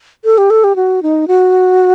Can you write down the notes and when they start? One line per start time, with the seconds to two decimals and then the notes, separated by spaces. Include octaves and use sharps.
0.25 A4
0.38 G4
0.50 A4
0.64 G4
0.76 F#4
1.03 D#4
1.28 F#4